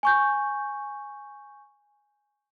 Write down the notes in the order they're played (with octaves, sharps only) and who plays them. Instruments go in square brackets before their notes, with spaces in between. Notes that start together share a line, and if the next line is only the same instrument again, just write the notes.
[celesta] G#5 C#6 G6